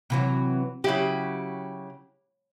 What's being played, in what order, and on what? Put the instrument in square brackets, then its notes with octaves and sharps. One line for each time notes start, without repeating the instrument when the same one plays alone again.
[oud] C3 E3 F#3
[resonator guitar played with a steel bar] C#3 E4 G4 [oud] F#3